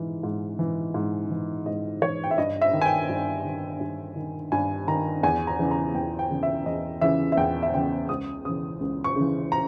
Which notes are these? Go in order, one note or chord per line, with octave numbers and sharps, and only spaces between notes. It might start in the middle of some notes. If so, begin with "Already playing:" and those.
Already playing: G#2 E3
G#2
E3
G#2
E3
G#2 D#5
E3 C#5
G5
E5
G2 D#5
E5
D#3
G#5
G5
G2
D#3
G2
D#3
G2 G#5
D#3 A#5
E2 G#5
A#5
C#3 E3
A#5
E2 G5
G5
C#3 E3
E5
E2 D#5
C#3 E3 E5
E5
E2 G5
E5
C#3 E3 G5
C#2 D#6
C#3 E3 D#6
C#2
C#6
C#3 E3
A#5